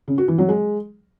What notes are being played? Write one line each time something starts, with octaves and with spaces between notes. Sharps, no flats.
C#3
F#4
E3
F#3
G#3